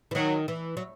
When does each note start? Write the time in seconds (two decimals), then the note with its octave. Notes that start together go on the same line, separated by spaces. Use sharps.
0.11 E3
0.15 D#3 F#3
0.48 E3
0.77 F#3